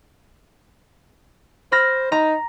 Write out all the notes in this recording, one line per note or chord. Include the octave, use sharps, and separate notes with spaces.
C5 B5 F6 A#6
D#4 A#5